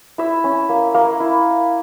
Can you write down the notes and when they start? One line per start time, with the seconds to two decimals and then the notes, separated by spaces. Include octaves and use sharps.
0.18 E4 E5
0.44 C#4
0.69 A#3
0.94 A#3
1.20 E4